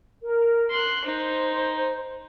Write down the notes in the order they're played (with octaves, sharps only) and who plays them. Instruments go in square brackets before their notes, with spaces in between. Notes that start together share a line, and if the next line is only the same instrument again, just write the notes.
[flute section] A#4
[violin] C6 F#6
[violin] D#4 [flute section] C5